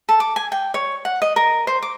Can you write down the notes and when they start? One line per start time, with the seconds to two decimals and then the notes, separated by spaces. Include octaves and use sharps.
0.09 A4
0.20 D6
0.36 G#5
0.52 G5
0.74 C#5
1.05 F#5
1.22 D#5
1.36 A#4
1.67 C5
1.82 D6